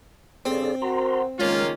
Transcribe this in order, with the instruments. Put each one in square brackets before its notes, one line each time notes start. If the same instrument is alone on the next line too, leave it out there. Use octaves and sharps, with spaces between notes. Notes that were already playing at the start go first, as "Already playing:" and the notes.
[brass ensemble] G2 C#3 [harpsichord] C4 [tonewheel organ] G#4 A4 D5
[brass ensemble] F#4 A#4 C5 [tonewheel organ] A#5 C6
[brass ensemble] C#2 D#3 [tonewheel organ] G#3 [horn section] A#3 C#4 F4